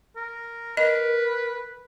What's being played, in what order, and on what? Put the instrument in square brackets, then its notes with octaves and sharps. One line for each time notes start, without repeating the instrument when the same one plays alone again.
[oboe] A#4
[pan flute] A#4 [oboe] B4 [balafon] D#5